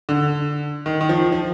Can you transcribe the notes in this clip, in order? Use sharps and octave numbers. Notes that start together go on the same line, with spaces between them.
D3
D#3
D#3
F3
F3